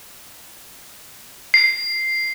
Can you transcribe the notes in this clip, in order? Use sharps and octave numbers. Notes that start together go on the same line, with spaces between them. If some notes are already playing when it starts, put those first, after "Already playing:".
C7